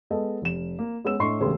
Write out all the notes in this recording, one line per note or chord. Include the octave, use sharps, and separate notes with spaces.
G#3 B3 A4 D#5
F1 E7
A#3
G#3 B3 C#4 B4 E6 E7
A2 D4 D#5 C6 C#6 C7
E1 C#3 A3 G4 B4 C6